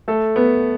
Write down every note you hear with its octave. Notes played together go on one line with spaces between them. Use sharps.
A3 A4
B3 B4